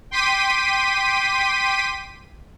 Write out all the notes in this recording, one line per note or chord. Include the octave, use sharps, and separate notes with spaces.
G5 C6 D6 B6 D#7